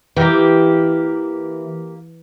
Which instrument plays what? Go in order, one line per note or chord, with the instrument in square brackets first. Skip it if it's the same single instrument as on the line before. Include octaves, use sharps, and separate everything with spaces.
[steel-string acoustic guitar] E3 [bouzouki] A#3 G4